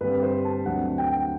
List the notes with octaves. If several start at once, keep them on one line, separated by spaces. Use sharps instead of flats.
G2 D3 G3 C4 B4
C5
A5
D2 D3 F#3 C4 F#5
G5